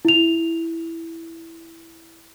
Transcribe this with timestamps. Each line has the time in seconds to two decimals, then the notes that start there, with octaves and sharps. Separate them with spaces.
0.05 E4 F7